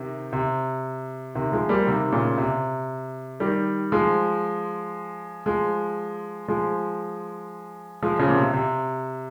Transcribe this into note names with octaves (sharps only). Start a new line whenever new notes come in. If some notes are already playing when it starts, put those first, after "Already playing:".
Already playing: C3 D#3
C3
C3 D#3
F3 G#3
G3 A#3
C3 D#3
A#2 C#3
C3
D#3 G3
F3 G#3
F3 G#3
F3 G#3
F3 G#3
C#3 F3
A#2
C3
C3